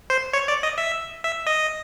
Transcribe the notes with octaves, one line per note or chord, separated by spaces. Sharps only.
C5
C#5
D5
D#5
E5
E5
D#5